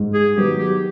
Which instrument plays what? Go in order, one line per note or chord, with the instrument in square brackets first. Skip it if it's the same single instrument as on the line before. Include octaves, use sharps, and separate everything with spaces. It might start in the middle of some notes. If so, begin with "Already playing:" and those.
Already playing: [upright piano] G#2
[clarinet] G#4
[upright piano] D#3 F#3 B3 [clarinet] G4
[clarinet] G4